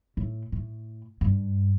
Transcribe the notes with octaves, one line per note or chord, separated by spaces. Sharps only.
A2
A2
G2